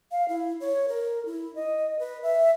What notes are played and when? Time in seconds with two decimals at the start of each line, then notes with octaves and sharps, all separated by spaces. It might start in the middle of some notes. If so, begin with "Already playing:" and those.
0.12 F5
0.29 E4
0.61 C#5
0.88 A#4
1.26 E4
1.55 D#5
1.99 B4
2.23 E5